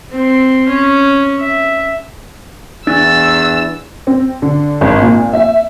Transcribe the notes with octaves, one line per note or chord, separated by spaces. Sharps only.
C4 C6
C#4
E5
E2 E3 D4 F#4 E5 E6 A6
C4
D3
G#1
A#2
E5